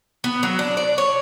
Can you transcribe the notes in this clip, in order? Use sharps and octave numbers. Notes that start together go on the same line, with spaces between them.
B3
F#3
D4
D5
C#5